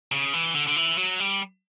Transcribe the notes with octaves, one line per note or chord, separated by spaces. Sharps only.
C#3
E3
D3
D3
E3
F#3
G3